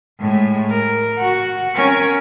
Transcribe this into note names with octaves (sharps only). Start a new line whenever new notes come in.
A2 G#3
A#4
F#4 F#5
C#4 A#4